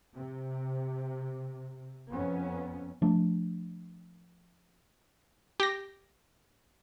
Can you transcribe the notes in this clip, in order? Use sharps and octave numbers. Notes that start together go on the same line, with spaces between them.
C3
F2 B3 C#4
F3 A3 D4
G4 A#6